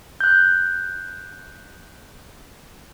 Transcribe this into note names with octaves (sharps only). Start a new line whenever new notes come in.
F#6 G6